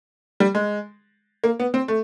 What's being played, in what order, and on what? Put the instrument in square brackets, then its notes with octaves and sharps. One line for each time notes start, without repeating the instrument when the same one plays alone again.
[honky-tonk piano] G3
G#3
A#3
B3
C4
A3